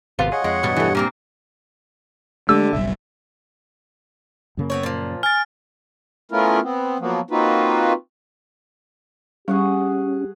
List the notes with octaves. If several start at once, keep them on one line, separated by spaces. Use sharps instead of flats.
G#1 C3 B3 F4
G#4 C#5 D#5 F#5
F2 G#3
E2 G2 B2 G3
E3 A3
A#2 A#3 C4 A#4
D3 G#3 A3 G4 E6
F#1 B1 G3 E5
F#2 C#3 A#3
B3 C4 C#5
A#2 F3
G#5 F6 A6
A3 B3 C#4 E4 F4 A#4
B3 C4
F3 F#3 A#3 B3
A#3 C4 D#4 F4 F#4 B4
G3 C#4 G4 G#4 F#5 C#6